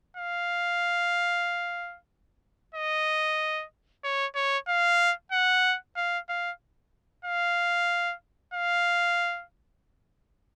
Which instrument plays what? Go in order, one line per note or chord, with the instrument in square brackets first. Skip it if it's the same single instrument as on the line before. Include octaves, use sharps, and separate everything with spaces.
[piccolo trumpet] F5
D#5
C#5
C#5
F5
F#5
F5
F5
F5
F5